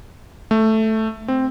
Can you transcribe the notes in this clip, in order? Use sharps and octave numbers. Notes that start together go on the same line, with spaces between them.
A3
C4